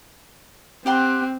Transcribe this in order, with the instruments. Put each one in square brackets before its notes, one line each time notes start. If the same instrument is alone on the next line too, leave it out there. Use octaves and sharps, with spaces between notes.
[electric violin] C4 [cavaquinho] G4 F#5 C6